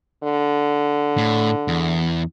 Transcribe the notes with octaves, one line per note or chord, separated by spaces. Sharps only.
D3
A2
E2